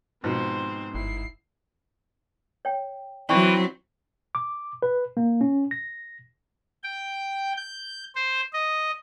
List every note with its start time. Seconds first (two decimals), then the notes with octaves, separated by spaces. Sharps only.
0.24 G#2 B2 D#3 F3 C4 C5
0.95 G1 E4 C7
2.65 C#5 G5
3.29 E3 F#3 C4 D5 G5 C#6
4.35 D6
4.82 B4
5.17 A#3
5.41 C#4
5.71 A#6
6.83 G5
7.57 G6
8.15 C5
8.53 D#5